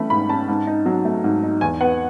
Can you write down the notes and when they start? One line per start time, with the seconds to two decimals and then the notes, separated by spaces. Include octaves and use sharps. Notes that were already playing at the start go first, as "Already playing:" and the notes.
Already playing: E3 A3 C#4 B5
0.10 G#2 B5
0.29 C#4 A5
0.48 G#2
0.67 D#4
0.86 F#3
1.05 A3
1.24 G#2
1.43 D#4
1.61 E2 G#5
1.81 B3 F#5